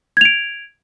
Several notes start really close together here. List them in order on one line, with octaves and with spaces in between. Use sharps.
G#6 F7 D7